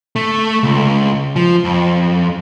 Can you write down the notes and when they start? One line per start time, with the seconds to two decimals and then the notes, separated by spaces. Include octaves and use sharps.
0.16 A3
0.63 C#2
1.36 F3
1.65 F2